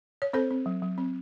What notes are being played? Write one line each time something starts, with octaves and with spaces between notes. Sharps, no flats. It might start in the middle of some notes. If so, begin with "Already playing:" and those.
C#5
C4 A4 C5
C4
F#3
F#3
C4